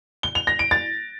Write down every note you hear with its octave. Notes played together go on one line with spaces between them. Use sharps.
G7
F7
A#6
D7
A6